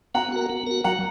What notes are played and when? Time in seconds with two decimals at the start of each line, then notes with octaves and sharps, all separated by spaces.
0.15 B3 F#5 A#5
0.32 F#4 A#4
0.50 B3
0.67 F#4 A#4
0.84 F#3 F#5 A#5